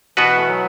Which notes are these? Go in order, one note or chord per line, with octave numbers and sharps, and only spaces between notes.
B2 E3 B3 F#4 B4
A3
F#3